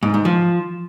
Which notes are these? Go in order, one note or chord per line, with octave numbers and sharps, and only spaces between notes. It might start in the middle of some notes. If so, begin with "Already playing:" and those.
G#2
G#2
F3